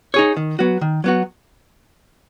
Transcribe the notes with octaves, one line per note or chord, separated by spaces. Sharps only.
D#4 G#4 C#5
D#3
F#3 B3 F#4
D#3
F#3 B3 F#4